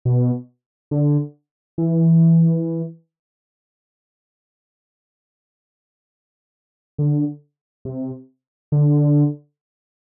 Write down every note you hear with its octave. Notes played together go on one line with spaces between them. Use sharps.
B2
D3
E3
D3
C3
D3